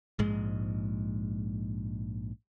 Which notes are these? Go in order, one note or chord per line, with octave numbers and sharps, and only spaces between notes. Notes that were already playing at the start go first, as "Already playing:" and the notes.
A#1 G#2 G#3